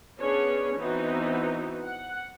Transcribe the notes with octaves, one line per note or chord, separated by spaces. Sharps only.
B3 C#4 D4 G#4 C#5
E3 B3 C4 D#4 F#4
F#5